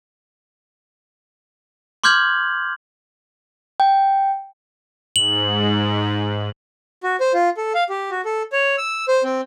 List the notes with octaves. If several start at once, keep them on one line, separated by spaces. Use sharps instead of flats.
C6 D6 F6 G6 G#6 F#7
G5
G#2 F#7
F#4
C5
F4
A4
F5
G4
F#4
A4
C#5
E6
C5
C4